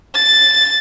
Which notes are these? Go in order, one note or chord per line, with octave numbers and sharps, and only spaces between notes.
A6